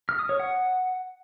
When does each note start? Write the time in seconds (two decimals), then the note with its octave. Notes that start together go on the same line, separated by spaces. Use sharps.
0.09 F6
0.19 D#6
0.29 C#5
0.40 F#5